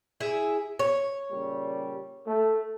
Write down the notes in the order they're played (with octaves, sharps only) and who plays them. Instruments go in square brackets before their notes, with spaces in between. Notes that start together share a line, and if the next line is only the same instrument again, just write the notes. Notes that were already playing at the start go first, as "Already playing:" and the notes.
[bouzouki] E4 G#4 E5
C#5
[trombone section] A#2 C#3 G3
A3